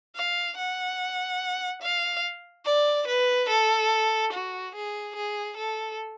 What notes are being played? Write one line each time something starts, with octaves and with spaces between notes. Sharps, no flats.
F5
F#5
F5
D5
B4
A4
F#4
G#4
G#4
A4